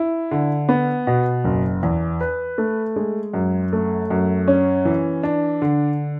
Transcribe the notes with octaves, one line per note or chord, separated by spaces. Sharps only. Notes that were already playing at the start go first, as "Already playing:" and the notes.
Already playing: E4
D3
B3
B2
F#1
E2
B4
A3
G#3
F#2
A3
F#2
C#4
E3
D4
D3